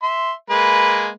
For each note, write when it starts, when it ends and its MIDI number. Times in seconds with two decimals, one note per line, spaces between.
0.03 0.33 76
0.03 0.33 84
0.50 1.09 56
0.50 1.09 58
0.50 1.09 71